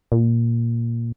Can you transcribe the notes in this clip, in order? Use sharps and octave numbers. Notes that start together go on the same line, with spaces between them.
A#2